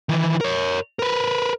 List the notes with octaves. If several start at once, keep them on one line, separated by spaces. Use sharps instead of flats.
D#3 E3
A#4 C#5
A#4 B4